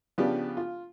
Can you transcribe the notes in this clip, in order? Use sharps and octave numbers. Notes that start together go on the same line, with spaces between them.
C#3 F3 B3 D4 G4
F4